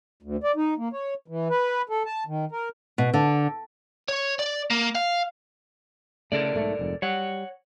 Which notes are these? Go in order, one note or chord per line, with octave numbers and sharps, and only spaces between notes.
D2
D5
D#4
A#3
C#5
E3
B4
A4
A5
D#3
A#4
B2
D3
C#5
D5
A#3
F5
C#3 A3 A4 A#4 D5
B1 G#2 A3
F1 F2 G#2
G3 C#5 F#5